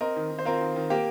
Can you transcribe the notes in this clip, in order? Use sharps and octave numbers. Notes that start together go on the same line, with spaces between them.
C4 A#4 D#5
D#3
D#3
C5
C4 F4 A#4
D#3
D#3
A#3 G4